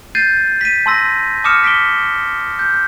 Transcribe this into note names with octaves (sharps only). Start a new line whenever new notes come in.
G6 A6 C7 D#7
B6 D#7
A5 C6 E6 A#6
A5 D6 D#6 F6 C#7 E7
B6 D7 G7
G6